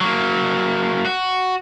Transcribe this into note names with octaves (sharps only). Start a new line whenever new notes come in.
F#3 A#3
F#4